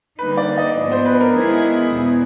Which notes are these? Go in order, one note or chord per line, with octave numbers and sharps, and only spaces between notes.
D3 G3 A#3 D#4 B4
D5
D#5
G#2 F3 G#3 B3 D4
C5
B4
A#4
D#3 G#3 B3 E4 G#4
E2 B2